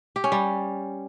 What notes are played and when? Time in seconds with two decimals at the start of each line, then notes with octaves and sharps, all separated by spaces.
0.16 G4
0.24 C#4
0.32 G3